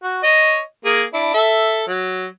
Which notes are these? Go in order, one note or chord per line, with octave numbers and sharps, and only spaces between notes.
F#4
C#5 D#5
A#3 G#4
D4 E4
A4 E5
F#3